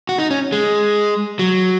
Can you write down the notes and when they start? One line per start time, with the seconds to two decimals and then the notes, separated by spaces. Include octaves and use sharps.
0.09 F#4
0.19 D#4
0.31 C#4
0.52 G#3
1.39 F#3